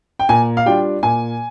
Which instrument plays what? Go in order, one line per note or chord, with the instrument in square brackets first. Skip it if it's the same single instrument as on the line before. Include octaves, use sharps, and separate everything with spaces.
[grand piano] G5
A#2 G#5
F5
G3 D4 F4 G5
A#2 G#5